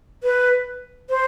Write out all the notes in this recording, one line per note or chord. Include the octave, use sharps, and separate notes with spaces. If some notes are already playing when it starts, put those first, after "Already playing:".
B4
C5